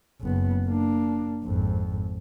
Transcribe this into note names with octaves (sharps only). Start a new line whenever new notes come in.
F#1 B3
A#3 D4
G#1 F2